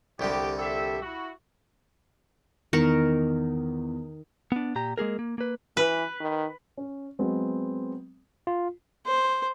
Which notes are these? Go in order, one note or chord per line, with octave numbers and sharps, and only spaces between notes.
C2 D3 G3 G4
G4 A4 E5
E4 F#4
E2 D#3 A#4 C#6
B3 D4
A#2 G4 A#5
G#3 A#3 G#4 A#4
A#3
A#3 B4
E3 B4
D#3
C#4
F#3 G#3 B3 C4
F4
C5